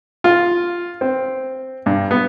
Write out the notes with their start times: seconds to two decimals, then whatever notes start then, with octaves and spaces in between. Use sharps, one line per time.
0.24 F4
1.01 C4
1.86 G2
2.11 B3